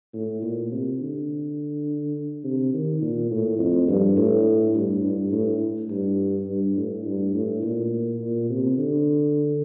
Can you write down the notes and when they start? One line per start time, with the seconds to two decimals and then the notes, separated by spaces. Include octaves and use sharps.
0.14 A2
0.42 A#2
0.71 C3
1.00 D3
2.44 C3
2.73 D#3
3.02 A#2
3.31 A2
3.59 F2
3.88 G2
4.16 A2
4.75 G2
5.03 G2
5.32 A2
5.90 G2
6.47 G2
6.76 A2
7.05 G2
7.34 A2
7.63 A#2
8.20 A#2
8.49 C3
8.77 D3